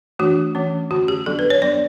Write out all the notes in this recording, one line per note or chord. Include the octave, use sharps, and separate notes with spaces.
E3 A3 D4 F#4
E3 A3 C#4
D3 A3 C#4 F#4
G4
F#3 B3 D4 A4
B4
C#5
F#3 B3 D4 D5